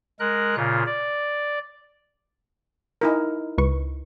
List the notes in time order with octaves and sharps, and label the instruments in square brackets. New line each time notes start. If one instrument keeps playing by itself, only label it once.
[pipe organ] G#3 A#4 F#6
A#2 C#3 F4
D5
[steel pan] D#4 E4 A#4
[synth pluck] C#2 B4 C#6